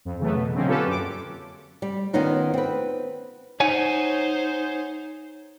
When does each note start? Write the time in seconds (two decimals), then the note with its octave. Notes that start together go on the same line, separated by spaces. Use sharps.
0.05 F2
0.19 C#3 E3 F#3 A3 B3
0.36 B2
0.54 D3 F#3 G#3 A#3 C4 C#4
0.67 A#3 C#4 F4 G4 A4 B4
0.87 F#2 D6
1.82 G3
2.13 D#3 B3 C#4 D#4 F4
2.54 C4 B4
3.60 D#4 C5 C#5 F#5 G#5